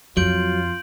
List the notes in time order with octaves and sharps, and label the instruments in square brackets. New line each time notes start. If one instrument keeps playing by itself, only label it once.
[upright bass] F2 [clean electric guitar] F#3 [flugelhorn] F4 [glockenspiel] G6 D7 F#7